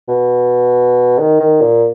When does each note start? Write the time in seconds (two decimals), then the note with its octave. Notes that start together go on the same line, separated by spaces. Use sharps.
0.08 B2
1.19 D#3
1.40 D#3
1.61 A#2